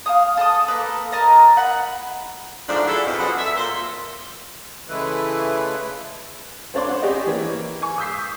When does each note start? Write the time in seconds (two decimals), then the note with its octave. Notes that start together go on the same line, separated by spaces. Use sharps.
0.06 F5 A5 D#6
0.37 A4 A5 D#6
0.68 A#3 A4 B4
1.12 A#4 D#5 A5 A#5
1.57 F#5 B5
2.68 G#2 F3 A3 D4
2.86 E4 F#4 G#4 A4
3.04 F2 B2
3.18 F#3 G#4 B4 C5 D5 F#5
3.37 A4 E5
3.55 A#2 C5
4.89 C#3 E3 G#3 A3 E4 B4
6.74 C4 D4 C#5 D5 C6
6.89 C5 F#5
7.02 C#4 G4 G#4 D5 D#5
7.27 E3 A#3
7.82 G#5 C#6
7.98 D#6 E6 G6 B6 C7